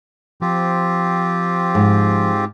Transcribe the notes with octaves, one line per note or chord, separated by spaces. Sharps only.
F3 C4 F4 G4
G#2